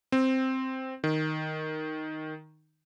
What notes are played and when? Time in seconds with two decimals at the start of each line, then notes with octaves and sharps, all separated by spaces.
0.12 C4
1.04 D#3